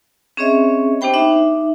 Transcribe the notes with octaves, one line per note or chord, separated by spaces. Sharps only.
C4 C#4 G#4 C#5 D#5 E5
B3 D4 G4 C5 G5 B5
D#4 E5 D6